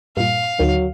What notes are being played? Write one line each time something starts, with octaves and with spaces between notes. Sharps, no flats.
G2 A#2 F5
D2 D#3 F#3